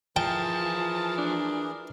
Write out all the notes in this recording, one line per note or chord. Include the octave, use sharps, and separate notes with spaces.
E3 F3 G#4 A#4 G5 A5
D4